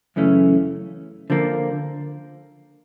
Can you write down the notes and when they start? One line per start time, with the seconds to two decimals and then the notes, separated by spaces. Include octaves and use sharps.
0.16 F#2 C#3 E3 A3 C#4
1.30 D3 F3 A#3